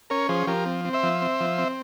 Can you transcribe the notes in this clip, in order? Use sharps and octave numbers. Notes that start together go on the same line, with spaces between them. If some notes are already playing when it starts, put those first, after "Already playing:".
C#4 A#4 C#5
F3 G#4 C5
F3 G4 A#4
C4
C4
C5 E5
F3
C4
F3
C4